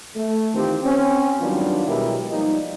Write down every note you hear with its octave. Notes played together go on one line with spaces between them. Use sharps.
A3
D#3 E3 C4 F4 G4
C4 C#4
D#3 F#3 G3 B3 D4 F4
B2 F#3 G#3 E4 G4 A#4
F3 G3 A#3 D#4